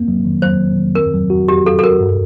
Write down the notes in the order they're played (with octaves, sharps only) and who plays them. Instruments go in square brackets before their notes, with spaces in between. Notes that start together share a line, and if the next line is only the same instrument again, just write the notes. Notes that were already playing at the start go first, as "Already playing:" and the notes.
Already playing: [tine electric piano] A#3 C4
F#3
D#3
[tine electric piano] F#3 [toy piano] C5
[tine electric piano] D#3
D#3
[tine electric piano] C4 [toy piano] A#4
[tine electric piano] F#3
F#4
[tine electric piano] F#4 [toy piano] G4
[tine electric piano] F#3 [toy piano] A4
[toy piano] A4
[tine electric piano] F#4 [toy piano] A#4
[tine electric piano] G2